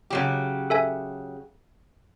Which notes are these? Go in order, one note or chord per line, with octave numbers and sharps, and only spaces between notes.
C#3 F#3 G4
A4 E5 G#5